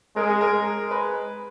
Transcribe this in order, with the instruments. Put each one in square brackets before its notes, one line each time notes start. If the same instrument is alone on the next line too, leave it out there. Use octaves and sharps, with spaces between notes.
[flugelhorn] G#3 [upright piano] A#4
[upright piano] G#4
A#4
[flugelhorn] G#3
[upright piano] B4